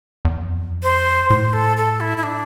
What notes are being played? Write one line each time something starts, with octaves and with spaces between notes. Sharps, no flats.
E2
F2
C5
A2 C5
A4
A4
E4
E4
D4